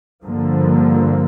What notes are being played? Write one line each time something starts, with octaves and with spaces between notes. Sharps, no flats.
G2 D3 F3 A#3